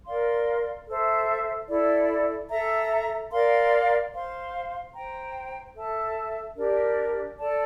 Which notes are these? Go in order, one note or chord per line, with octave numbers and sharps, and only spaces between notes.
A#4 D5 F5 C6
A4 C5 E5
E4 A4 D5
A4 E5 A#5
A#4 D5 F5 C6
C5 F5 C6
C5 G5 A#5
A4 E5 A5
D4 G4 A#4 D5
A4 D5 A5